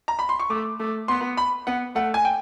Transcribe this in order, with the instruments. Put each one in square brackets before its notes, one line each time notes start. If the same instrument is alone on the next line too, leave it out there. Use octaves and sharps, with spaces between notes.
[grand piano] A#5
B5
C6
C#6
[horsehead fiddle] A3 [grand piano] D6
[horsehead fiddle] A3
[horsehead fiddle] B3 [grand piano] C6
[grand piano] B5
[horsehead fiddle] B3 [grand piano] F#5
[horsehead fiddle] A3 [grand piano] F#5
[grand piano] G#5
G5